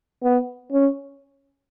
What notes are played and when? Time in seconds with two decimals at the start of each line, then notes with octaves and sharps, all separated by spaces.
0.23 B3
0.72 C#4